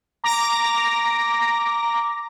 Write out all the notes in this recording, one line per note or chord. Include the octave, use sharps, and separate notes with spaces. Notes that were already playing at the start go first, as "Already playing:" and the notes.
A#5 D6 A#6